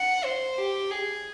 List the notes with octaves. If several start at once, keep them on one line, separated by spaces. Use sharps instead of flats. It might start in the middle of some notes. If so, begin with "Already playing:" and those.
Already playing: F#5
C5
G4
G#4